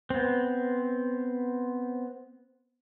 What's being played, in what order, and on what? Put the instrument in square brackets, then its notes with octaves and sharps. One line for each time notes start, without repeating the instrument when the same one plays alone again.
[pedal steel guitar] B3 C4